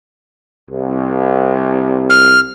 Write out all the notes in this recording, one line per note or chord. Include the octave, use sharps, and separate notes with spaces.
C2
F6